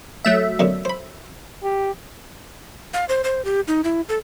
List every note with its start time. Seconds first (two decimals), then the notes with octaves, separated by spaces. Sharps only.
0.25 F#3 A3 E5
0.59 F#2 B2 D3
0.85 C5 B5
1.63 G4
2.93 F5
3.09 C5
3.24 C5
3.45 G4
3.68 D#4
3.84 E4
4.09 A4